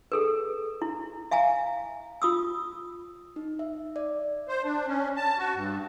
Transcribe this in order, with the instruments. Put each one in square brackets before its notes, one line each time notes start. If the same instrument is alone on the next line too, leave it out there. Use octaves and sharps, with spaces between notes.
[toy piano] G#4 A4 B4
E4
E5 F5 G#5 A#5
F4 D#6 E6
[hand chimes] D#4
E5
D5
[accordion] C5
D4
C#4
A5
F#4
G2